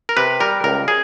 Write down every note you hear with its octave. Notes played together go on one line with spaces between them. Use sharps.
A#4
C3 B4
G3 A#4
C#2 A#4
G#4